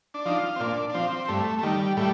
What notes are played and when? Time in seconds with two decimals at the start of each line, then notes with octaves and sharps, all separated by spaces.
0.14 D4
0.25 F3 D#4
0.38 F4
0.56 C4
0.60 A#2 D4
0.89 D4
0.94 F3 C4
1.28 G2 A3
1.59 A3
1.63 D#3 G3
1.97 A2 G3